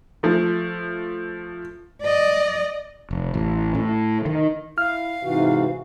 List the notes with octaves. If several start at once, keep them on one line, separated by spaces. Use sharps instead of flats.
F3 A3
D5 D#5
F1
A1
A2
D#3
E4 F5 F6
G#2 C3 E3 F#4